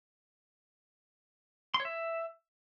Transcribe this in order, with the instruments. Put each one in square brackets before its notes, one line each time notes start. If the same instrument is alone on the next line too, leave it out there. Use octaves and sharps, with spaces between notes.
[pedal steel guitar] C6
C#5
E5